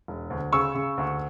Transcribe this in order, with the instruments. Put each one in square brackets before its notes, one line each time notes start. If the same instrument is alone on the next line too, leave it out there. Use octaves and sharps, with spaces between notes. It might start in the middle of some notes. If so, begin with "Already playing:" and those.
[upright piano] E1
D2
C#3 C#6 E6
C#3
D2